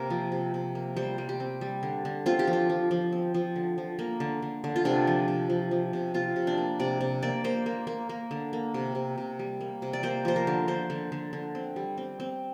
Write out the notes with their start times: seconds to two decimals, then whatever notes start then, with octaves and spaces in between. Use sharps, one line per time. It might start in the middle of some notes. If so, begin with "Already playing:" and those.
Already playing: C3 A#3 A#4
0.10 F3
0.32 C3
0.54 C3
0.75 A#3
0.96 G3 C5
1.18 G3
1.29 G4
1.40 C4
1.61 G3
1.83 D3
2.05 D3
2.26 C4 F4
2.39 G4
2.47 F3
2.53 F4
2.70 F3
2.91 F3
3.12 C4
3.34 F3
3.56 D3
3.78 F3
3.99 A#3
4.20 D3
4.42 D3
4.64 D3
4.76 F4
4.85 C3 D4
5.07 F3
5.28 C3
5.50 F3
5.71 F3
5.93 C3
6.14 C3 F4
6.36 C3
6.47 D4
6.57 A#3
6.80 C3 D5
7.01 C3
7.23 A#3 D5
7.44 A#3 C5
7.66 A#3
7.87 A#3
8.09 A#3
8.31 D3
8.53 A#3
8.74 C3
8.95 C3
9.18 C3
9.39 G3
9.61 A#3
9.82 C3
9.93 D5
10.03 A#3 C5
10.25 F3 C5
10.36 A#4
10.47 D3
10.68 D3 C5
10.90 D3
11.12 D3
11.33 D3
11.55 C4
11.76 G3
11.97 C4
12.20 C4